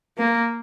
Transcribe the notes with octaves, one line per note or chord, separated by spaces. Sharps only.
A#3